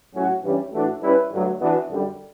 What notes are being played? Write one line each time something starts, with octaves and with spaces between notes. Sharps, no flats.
A2 F#3 C#4 F#4
G2 E3 G3 C#4
A2 E3 A3 D4 F#4
G3 C#4 E4 B4
G2 D3 F#3 A3
E3 B3 D4 F#4
F#2 D3 G3